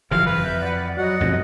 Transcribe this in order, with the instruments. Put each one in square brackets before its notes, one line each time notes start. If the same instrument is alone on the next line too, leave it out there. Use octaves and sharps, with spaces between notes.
[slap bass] F#1 E3 F3 [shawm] F5
[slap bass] F2 [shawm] B4
[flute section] E5 G6
D5 F#5
[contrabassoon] F#3 [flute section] D#5 [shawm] F#5
[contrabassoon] F1 [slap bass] F#2 B2 F3